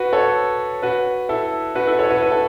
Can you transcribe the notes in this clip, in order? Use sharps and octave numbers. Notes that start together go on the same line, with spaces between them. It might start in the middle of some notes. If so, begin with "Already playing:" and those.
Already playing: F#4 B4
A4 C#5
F#4 B4
E4 A4
F#4 B4
E4 A4
A4 C#5
F#4 B4
B4
A4